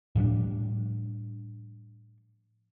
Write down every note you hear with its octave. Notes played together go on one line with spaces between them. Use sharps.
A2 F3 G3 D4